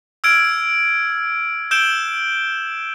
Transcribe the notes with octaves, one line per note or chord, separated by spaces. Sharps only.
E6 F6 G#6 D7
E6 G6 D7 E7 G7